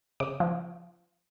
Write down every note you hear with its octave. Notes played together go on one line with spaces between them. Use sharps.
C#3 D6
F3